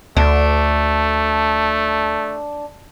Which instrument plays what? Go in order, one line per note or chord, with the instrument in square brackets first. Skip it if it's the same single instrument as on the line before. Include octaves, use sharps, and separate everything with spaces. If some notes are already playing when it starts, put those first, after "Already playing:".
[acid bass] D2 [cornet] A3 [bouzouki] D4